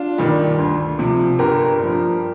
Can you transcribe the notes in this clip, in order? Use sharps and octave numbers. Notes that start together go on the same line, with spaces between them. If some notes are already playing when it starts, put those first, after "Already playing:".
Already playing: D4 F4
G2 D#3 G3
D2
C3 F3
G1 G4 A#4
G2 F3